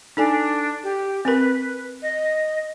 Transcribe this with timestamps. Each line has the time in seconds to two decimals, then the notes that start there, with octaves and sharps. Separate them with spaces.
0.17 D4 D#4 A4 G#5
0.83 G4
1.25 C4 A#4 B4
2.02 D#5